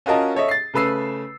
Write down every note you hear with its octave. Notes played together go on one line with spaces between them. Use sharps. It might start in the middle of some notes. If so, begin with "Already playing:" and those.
C#4 F4 F#4 A#4 D#5 A5
A4 C#5 D#5 E5
A6 C7
C#3 A3 B4 E6 C7